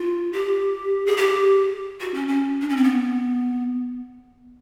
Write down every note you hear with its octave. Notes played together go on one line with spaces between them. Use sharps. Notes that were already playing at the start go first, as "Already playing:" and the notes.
Already playing: F4
G4
G#4
G4
F#4
C#4
C#4
D4
C#4
C4
B3